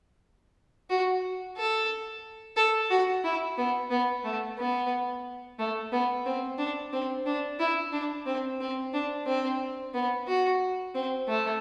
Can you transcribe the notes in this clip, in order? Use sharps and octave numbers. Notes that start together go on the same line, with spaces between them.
F#4
A4
A4
F#4
E4
B3
B3
A3
B3
A3
B3
C4
D4
C4
D4
E4
D4
C4
C4
D4
C4
B3
F#4
C4
A3